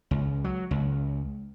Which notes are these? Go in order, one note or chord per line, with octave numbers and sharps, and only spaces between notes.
C#2
F#3
C#2